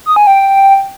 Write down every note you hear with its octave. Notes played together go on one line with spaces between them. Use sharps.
D#6
G#5
G5